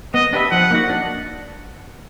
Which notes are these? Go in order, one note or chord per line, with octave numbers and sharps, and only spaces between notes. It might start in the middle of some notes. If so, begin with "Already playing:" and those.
B3 D#5
D4 G4 B4 E5
F3 F#5
A#3 D#4 F#4
D4